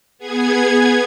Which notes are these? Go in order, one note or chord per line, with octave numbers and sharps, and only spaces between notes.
B3 G#4 G#6